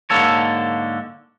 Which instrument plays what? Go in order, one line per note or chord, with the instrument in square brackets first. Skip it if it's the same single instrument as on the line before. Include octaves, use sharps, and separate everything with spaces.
[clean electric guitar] G#2 D3 A#3 A4 C#5